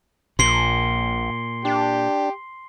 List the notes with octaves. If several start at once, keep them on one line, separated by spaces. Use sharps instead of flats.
A#1 A#2 C6 C7 G7
D4 G4